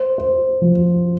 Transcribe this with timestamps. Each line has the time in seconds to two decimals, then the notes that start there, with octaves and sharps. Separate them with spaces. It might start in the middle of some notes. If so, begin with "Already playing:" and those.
Already playing: C5
0.18 C5
0.62 F3